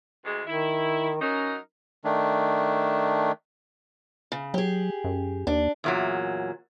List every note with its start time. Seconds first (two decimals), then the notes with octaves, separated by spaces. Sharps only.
0.25 D2 G#3
0.47 D#3 E4
1.21 F#3 C#4 D#4 A#4
2.04 D#3 A3 D4
4.32 C#3
4.54 F#3 G4 G#4
5.04 F#2
5.47 D#2 D4
5.84 E2 A#2 F#3